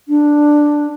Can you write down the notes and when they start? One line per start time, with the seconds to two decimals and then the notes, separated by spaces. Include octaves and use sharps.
0.08 D4